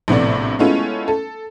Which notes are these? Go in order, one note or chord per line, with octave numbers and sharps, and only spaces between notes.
A#1 A2 C3 B3 D5
G#3 A3 B3 C#4 E4 F4
A4